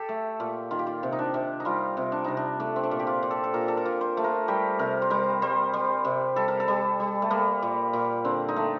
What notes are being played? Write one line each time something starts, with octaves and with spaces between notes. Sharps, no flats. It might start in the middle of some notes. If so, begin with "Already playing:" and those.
Already playing: G4 A4
A3
A#2
D#3 F4
G4
F4
C3
D#4
D4
C3
D#4
G3 F4
C3
D4
C3 D#4
D4
A3 D4
C4
D4
A#2
G4
F4
A#2
A4
A4
A#2 A#4
A4
A#4
A#2
C5
A3
A#4
G3 G4
C3 A#4
C5
G3 A#4
G3 C5
G3
C3
G3 A4
A#4
A4
G3
G3
A3
G3 A#3
A#2
A#2
D3 C4
D#4
A3